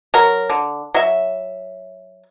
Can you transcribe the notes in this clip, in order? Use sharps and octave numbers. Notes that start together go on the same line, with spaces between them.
F#3 A#4
D3
F#3 E5